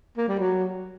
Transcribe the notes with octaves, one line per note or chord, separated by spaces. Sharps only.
A#3
G3
F#3